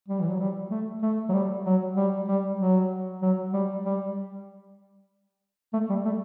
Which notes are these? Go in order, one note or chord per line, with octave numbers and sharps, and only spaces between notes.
G3
E3
F#3
G3
A3
A3
F#3
G3
F#3
G3
G3
F#3
F#3
G3
G3
A3
G3
A3